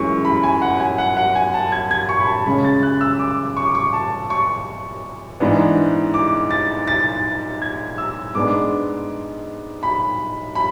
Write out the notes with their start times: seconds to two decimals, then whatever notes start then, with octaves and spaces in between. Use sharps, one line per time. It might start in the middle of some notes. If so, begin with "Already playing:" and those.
Already playing: F#2 E3 G#3 C#4 C#6
0.25 B5
0.43 G#5
0.62 F#5
0.80 G#5
0.98 F#5
1.17 F#5
1.35 G#5
1.54 A5
1.72 G#6
1.91 G#6
2.09 C#6
2.20 B5
2.27 A5
2.46 C#3 G#3 C#4 B5
2.64 A6
2.83 F#6
3.01 E6
3.19 D6
3.57 C#6
3.66 D6
3.75 C#6
3.93 A5
4.30 C#6
5.40 G#2 E3 B3 D4
6.14 D6
6.51 A6
6.87 A6
7.62 G#6
7.98 E6
8.35 G#2 G#3 B3 D4 D6
9.83 B5
10.55 B5